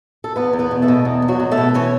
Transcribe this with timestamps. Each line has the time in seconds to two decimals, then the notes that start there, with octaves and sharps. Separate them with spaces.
0.24 A4
0.36 E2 B3 B4
0.53 E2
0.59 B3 B4
0.71 B2
0.82 A3 A4
0.88 B2
1.05 E2
1.22 E2
1.28 F#3 F#4
1.40 B2
1.51 A3 A4
1.57 B2
1.74 E3 C#4 C#5